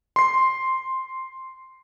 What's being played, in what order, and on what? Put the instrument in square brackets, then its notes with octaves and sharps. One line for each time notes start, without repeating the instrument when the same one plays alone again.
[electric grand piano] C6 C7